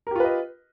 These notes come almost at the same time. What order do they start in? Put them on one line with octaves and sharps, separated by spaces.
A#4 G4 F4 B4 D#5